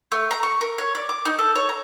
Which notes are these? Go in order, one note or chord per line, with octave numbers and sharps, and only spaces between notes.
A3
A#5
C#6
A#4
C#5
D5
D6
D#4
A4
C#5
A#5